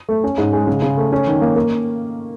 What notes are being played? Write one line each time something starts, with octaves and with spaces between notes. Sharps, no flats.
A3
C#4
G#2
G#3
C#3
C#3
A3
C#4
D#3
A#3
A#3